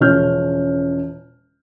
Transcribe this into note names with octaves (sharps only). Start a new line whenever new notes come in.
E1 C#3 F3 C#4 F6 G6